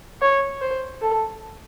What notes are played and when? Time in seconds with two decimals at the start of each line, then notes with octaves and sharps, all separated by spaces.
0.21 C#5
0.62 C5
1.02 A4